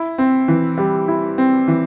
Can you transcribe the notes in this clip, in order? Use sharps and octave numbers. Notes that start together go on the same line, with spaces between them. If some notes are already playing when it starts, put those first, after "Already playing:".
Already playing: E4
C4
E3
G3
E4
C4
E3